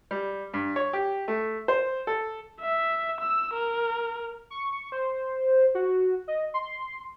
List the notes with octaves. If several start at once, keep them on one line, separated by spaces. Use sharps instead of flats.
G3
G2
C#5
G4
A3
C5
A4
E5
E6
A#4
C#6
C5
F#4
D#5
C6